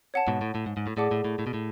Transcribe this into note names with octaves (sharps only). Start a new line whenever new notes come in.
C#5 F#5 A5
G#2 B2
A2
A2
G#2
G#2
A2
A2 G#4 D5 F#5 A5 D6
A2
A2
A2
B2
A2